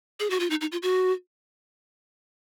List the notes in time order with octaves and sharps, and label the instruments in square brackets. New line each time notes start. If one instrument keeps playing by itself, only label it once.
[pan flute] G#4
F#4
F4
D#4
D#4
F4
F#4